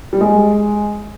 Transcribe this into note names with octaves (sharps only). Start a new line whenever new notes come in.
G3
G#3